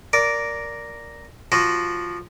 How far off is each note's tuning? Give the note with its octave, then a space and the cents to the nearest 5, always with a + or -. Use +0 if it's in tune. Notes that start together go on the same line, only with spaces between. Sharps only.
A#4 +0 D5 -10
F3 +0 F#4 +15